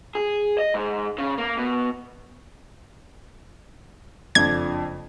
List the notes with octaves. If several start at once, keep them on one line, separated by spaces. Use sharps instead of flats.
G#4
D#5
G#2
C#3
A#3
B2
F#1 F2 F3 D4 G#6